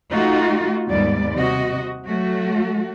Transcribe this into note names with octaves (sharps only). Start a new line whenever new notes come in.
A3 D#4 F4 F#4
D#2 G#2 G3 B3 D5
C3 F#4 D#5
F#3 A3 F#4